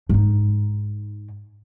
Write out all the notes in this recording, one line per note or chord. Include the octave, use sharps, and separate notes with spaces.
G#2 D#4